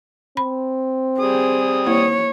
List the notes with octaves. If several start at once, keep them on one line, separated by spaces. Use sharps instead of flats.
C4 B5
G3 G#4 D#6
A#3 E4 C5 C#5